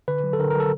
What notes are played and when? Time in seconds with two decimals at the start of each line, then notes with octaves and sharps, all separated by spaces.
0.08 D3 B4
0.24 F#3
0.33 A4
0.39 D3 A#4
0.50 A#4
0.56 F#3 A4